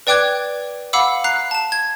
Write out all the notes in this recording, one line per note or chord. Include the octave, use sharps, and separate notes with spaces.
B4 D5 G5 D6 F#6 G#6
F5 F#5 B5 D6 E6
A#5 F#6 C7
A5 E7
G#6